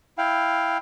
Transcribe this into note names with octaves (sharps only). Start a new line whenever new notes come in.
E4 F5 G5